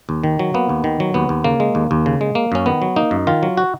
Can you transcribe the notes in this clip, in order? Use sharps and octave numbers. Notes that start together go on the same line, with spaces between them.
D#2
D#3
F#3
A#3 B3
D#2
D#3
F#3
D#2 B3
D#2
C#3 A#3
G#3
D#2
D#2
C#3
G#3
A#3
F#2 C#4
D#3 B3
F#3
A#3 D#4
F#2
D#3 F4
F#3
F#4